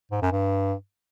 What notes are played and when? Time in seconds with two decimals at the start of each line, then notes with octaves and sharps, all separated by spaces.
0.12 G#2
0.22 F#2
0.32 G2